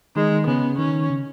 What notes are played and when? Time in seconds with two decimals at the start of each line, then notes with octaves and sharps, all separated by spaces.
0.16 D#3 G#3 D#4
0.47 C#3 B3 C#4
0.78 D#3 C#4 D#4
1.10 C#3 C#4